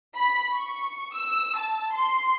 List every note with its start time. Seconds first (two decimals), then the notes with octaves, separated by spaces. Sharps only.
0.16 B5
0.55 C#6
1.16 E6
1.60 A5
1.93 C6